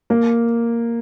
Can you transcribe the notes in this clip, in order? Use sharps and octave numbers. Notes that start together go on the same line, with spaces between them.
A#3